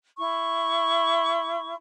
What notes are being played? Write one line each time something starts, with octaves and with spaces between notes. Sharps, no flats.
E4 C#6